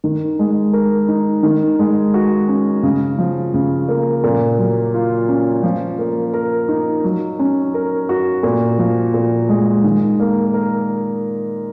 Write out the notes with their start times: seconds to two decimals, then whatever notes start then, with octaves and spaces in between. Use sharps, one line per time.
0.04 D#3
0.39 G#3
0.73 A#4
1.08 D#4
1.43 D#3
1.79 G#3
2.14 F#4
2.48 C#4
2.83 C#3
3.19 F3
3.54 C#3
3.88 A#3
4.24 A#2
4.59 F#3
4.94 F4
5.28 C#4
5.63 F3
5.99 A#3
6.34 A#4
6.69 D#4
7.04 F#3
7.39 C#4
7.74 A#4
8.09 F#4
8.43 A#2
8.78 F3
9.14 A#2
9.49 G#3
9.84 D#3
10.20 A#3
10.54 A#4